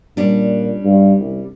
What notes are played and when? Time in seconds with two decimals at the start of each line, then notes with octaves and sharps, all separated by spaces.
0.17 A#2 G3 C#4 D4
0.85 G2
1.20 C2